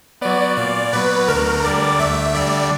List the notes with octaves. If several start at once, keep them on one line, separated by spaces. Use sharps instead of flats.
F#3 B3 D5
A#2 D5
F#3 B3 B4
D2 A#4
D3 G3 D5
D2 E5
D3 G3 D5